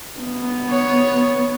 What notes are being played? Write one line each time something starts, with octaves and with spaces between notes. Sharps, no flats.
B3
C#5